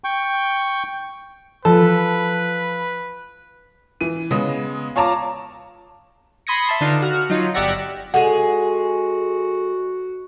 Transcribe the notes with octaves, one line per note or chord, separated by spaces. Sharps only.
G5 C#6
F3 A4 B4
E3 D#7
C#3 G#3 B3
F4 C#5 A5 A#5 D6
B5 C6 D#6 G#6 A#6 C#7
E5 A5 C6
D3 D4 D#4 F4 B4
F#4 F6
F#3 D#4 F4
G1 G4 D5 E5 F#5 A#6
G#3 F#4 G#4 A4 F#5